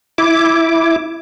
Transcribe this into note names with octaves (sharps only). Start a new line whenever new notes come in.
E4 D6